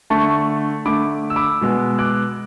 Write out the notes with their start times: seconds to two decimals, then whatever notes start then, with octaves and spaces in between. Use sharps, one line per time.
0.10 D3 A3 A5 C#6
0.85 D3 A3 B5 D6
1.30 E6
1.36 B5 D6
1.61 B2 G#3 B3
1.99 D6 F#6